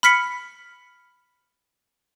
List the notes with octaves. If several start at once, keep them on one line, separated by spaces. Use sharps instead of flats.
B5 F6 B6 C#7